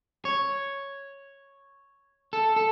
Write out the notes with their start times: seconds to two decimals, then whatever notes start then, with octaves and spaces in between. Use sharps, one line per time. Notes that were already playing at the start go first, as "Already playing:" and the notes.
0.25 C#5
2.33 A4
2.56 A4